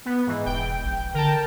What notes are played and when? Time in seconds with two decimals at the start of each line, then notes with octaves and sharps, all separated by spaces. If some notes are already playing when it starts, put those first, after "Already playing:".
0.05 B3
0.27 G#2 E3
0.46 E1 G5
0.84 A#1
1.14 D3 A#4 G5 A5